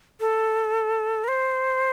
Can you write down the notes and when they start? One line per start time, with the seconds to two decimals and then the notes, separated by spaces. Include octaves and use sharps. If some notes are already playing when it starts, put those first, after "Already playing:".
0.20 A4
1.24 A#4
1.28 C5